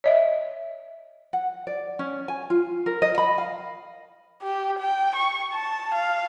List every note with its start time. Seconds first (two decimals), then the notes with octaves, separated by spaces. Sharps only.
0.04 C#5 D#5 E5
1.33 F#5
1.67 D5
1.99 C#4
2.28 G#5
2.50 F4
2.86 A#4
3.02 D#5
3.18 B5
3.38 F5
4.42 G4
4.79 G5
5.16 C#6
5.53 A5
5.95 F5